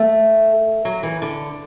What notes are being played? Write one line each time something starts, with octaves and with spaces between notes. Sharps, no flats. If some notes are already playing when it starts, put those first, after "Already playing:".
Already playing: A3
F#3
E3
D3